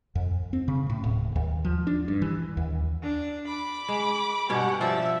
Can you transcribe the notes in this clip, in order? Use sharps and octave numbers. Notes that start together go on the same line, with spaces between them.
F2
C4
C#3
A2
D1
D#2
F3
D4
G2
E3
D#2
D4
B5 D6
G#3
G2 B2 C#4 G4 F#5
F3 D5 E5